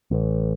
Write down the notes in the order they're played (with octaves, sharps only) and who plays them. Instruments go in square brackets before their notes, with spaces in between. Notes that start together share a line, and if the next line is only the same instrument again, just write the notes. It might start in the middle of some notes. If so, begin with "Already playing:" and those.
[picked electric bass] A1